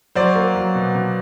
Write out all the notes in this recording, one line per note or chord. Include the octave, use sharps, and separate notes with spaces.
F#3 C5 D5
A#3
F#3
B2
B2